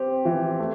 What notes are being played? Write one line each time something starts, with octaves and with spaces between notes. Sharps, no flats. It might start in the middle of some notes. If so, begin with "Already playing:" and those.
Already playing: C4 G4
E3
A3